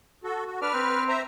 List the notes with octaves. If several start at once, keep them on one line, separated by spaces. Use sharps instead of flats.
F#4 A4
F#4
D4 B4 F6
C4
C5 E5 A#5